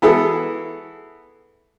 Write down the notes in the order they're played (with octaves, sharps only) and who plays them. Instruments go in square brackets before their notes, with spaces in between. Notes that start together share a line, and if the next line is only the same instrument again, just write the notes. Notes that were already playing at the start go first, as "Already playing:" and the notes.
[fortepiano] E3 B3 E4 G#4 A4